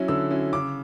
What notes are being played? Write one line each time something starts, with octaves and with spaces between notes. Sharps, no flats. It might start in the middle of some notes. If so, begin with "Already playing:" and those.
Already playing: F#3 C#4 E4
D3 E6
F#3 C#4 E4
C#3 D6